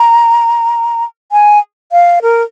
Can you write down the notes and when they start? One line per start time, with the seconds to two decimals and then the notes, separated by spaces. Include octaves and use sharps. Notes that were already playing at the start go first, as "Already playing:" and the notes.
Already playing: A#5
1.32 G#5
1.92 F5
2.22 A#4